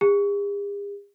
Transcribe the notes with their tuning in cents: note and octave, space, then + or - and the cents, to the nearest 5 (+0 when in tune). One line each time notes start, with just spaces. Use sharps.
G#4 -45